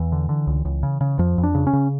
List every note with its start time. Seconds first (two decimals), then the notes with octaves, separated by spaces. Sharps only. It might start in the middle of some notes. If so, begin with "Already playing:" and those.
Already playing: E2 E3
0.12 D3
0.29 D3
0.47 C#2
0.65 C#2
0.83 C#3
1.01 C#3
1.19 F2 F3
1.38 F2
1.43 D4
1.55 C#3
1.67 C#4
1.73 C#3